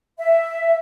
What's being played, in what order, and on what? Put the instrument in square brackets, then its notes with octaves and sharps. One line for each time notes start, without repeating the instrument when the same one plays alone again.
[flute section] E5